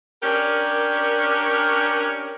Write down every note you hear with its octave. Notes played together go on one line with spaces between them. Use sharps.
C#4 D4 G4 A#4